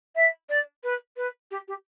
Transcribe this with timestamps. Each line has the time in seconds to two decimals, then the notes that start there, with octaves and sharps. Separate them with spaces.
0.16 E5
0.49 D5
0.84 B4
1.17 B4
1.51 G4
1.68 G4